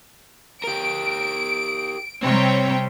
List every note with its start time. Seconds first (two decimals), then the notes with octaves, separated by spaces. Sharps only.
0.64 G4 A#4 D7
2.23 C3 G3 C4 C#5 G5 A#5